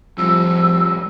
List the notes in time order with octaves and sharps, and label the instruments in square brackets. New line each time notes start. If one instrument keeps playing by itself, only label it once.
[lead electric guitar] F2 G3 [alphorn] F3 [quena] E6